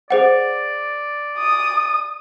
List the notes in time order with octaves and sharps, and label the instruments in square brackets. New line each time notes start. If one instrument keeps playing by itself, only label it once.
[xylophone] G#4 C5 F#5 [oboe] D5
[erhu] D#6